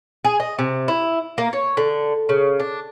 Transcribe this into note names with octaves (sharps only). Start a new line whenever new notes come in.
G#4
D#5
C3
E4
A#3
C#5
D3
C#3
D4